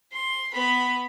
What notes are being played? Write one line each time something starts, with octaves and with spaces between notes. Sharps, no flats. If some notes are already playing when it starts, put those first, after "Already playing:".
C6
B3 B5